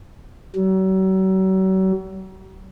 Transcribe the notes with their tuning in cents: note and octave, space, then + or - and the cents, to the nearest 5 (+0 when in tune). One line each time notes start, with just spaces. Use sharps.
F#3 +40